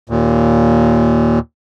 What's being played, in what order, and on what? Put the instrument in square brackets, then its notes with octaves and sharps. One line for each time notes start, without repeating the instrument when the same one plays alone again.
[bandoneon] D#2 A#2